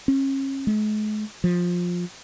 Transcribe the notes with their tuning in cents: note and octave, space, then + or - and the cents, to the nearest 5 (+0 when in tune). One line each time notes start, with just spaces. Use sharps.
C#4 -35
G#3 +45
F3 +15